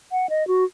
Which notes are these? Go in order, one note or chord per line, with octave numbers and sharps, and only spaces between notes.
F#5
D#5
F#4